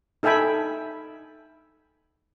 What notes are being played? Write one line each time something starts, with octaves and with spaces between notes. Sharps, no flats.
D#4 A4 E5 G5 G#5 B5